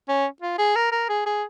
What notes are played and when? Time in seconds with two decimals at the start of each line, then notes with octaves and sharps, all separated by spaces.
0.09 C#4
0.42 F4
0.59 G#4
0.76 A#4
0.92 A#4
1.09 G#4
1.26 G#4